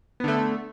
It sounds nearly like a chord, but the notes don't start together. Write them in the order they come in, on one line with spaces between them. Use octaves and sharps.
B3 D3 A3